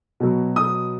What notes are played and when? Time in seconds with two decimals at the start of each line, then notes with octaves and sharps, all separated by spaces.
0.20 B2 F#3
0.56 D#6